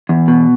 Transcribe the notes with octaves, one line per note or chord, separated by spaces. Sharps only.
E2
B2